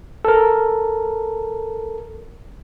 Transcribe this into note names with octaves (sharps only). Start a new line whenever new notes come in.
A4 A#4